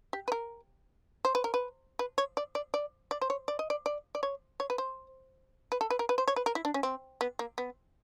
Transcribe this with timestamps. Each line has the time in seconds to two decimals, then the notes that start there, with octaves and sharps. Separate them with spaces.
0.13 G4
0.28 B4
0.32 A#4
1.25 C5
1.35 B4
1.44 A#4
1.54 B4
1.99 B4
2.18 C#5
2.37 D5
2.55 D5
2.74 D5
3.11 D5
3.21 C5
3.30 C#5
3.48 D5
3.59 D#5
3.70 D5
3.86 D5
4.15 D5
4.23 C#5
4.60 C#5
4.70 B4
4.78 C5
5.72 B4
5.81 A4
5.90 B4
5.99 A#4
6.09 B4
6.18 C5
6.28 C#5
6.36 B4
6.46 A#4
6.55 E4
6.65 D4
6.74 C#4
6.83 C4
7.21 B3
7.39 A#3
7.58 B3